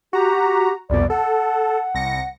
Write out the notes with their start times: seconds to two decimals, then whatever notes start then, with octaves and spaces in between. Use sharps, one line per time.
0.13 F#4 G4 A#5
0.90 C2 F2 B2 D5
1.10 A4 F#5
1.95 C2 A#6 C#7